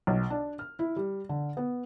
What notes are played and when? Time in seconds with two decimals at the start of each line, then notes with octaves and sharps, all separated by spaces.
0.07 B1
0.30 D4
0.59 F6
0.79 E4
0.96 G3
1.29 D3
1.57 B3